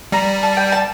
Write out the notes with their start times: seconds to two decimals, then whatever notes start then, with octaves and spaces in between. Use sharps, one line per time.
0.12 G3 A#5
0.43 A5
0.57 G5
0.72 A5